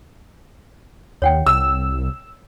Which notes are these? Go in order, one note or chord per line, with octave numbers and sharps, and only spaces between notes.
D#2 C#5 F#5 G5
C2 E6